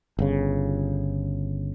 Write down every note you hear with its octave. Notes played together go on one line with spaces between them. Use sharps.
G1 C#3